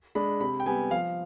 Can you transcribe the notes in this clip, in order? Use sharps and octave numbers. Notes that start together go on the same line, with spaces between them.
G#3 D4 B5
C3 B5
G5
G3 B3 G#5
F3 F5